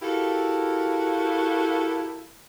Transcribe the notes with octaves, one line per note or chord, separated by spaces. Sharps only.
E4 F#4 G4 A4 A#4 F5